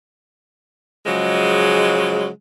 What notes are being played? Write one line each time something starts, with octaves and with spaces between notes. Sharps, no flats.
C#3 F3 F#3 G#3